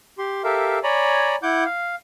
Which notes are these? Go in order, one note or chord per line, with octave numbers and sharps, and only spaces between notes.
G4 C6
G4 A4 A#4 E5 F5
C#5 D5 G#5 A#5 B5
E4 F#5 D6 G6
F5